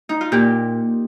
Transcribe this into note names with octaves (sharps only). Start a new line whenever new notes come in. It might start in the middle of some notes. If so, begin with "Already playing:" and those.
D#4
F4
A#2 G4